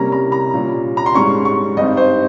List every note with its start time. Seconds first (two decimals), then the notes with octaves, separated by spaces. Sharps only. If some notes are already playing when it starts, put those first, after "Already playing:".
Already playing: C3 G3 A#3 C#4 A#5
0.12 A#5
0.32 A#5
0.54 A#2 G3 C#4
0.97 A#5
1.06 C6
1.15 G#2 G3 C#4 C#6
1.45 C#6
1.77 G2 G3 C4 D#4 D#5
1.97 C5